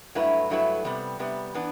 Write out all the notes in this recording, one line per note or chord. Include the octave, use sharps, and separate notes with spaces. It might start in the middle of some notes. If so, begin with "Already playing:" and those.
G2 F#3 A3 E4 B4
G2 F#3 A3 E4 B4
C3 G3 B3
C3 G3 B3
E3 B3 D4